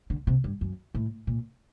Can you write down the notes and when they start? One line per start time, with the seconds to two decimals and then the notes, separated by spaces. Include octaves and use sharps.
0.10 D3
0.27 C3
0.44 G2
0.61 F#2
0.95 A2
1.27 A#2